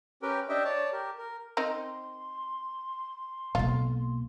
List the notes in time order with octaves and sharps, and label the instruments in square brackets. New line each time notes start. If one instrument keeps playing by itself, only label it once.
[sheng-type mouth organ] C#4 G4 A#4 B4 G5
D4 G4 D#5 E5 G5
C#5 D5 A5
G4 A#4
A#4
[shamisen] C4 D#4 A#4 [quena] C6
[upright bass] B1 A#3 [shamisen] F4